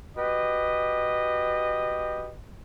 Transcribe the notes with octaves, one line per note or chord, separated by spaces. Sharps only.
F#4 G4 B4 D#5